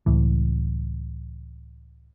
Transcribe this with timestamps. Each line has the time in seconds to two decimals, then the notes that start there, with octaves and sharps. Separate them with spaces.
0.06 C#2 A2 E3